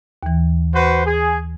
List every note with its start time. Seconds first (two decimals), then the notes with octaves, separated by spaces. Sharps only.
0.23 D#2 E3
0.74 F#4 B4 C5
1.06 G#4